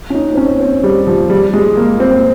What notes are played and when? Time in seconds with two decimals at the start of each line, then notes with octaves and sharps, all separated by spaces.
0.10 C#4
0.15 D#4
0.34 C4
0.37 C#4
0.60 C4
0.83 G3
1.07 F3
1.30 G3
1.53 G#3
1.77 A#3
2.00 C4